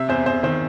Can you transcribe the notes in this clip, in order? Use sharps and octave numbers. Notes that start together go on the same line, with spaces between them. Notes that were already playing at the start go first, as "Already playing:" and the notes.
Already playing: C3 E5
E2 C5
E2 C5
D#3 C5